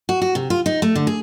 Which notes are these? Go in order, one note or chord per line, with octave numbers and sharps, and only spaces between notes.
F#4
F#4
C3
F4
D#4
A3
D3
G#4